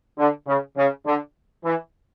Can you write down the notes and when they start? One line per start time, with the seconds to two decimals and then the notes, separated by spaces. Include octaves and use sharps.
0.18 D3
0.47 C#3
0.77 C#3
1.06 D3
1.64 E3